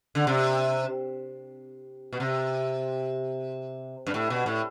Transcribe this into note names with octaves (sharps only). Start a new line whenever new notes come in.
D3
C3
B2
C3
G2
A2
B2
A2